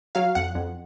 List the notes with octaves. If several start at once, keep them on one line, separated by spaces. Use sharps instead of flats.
F#3 F5
F2 F#5
F2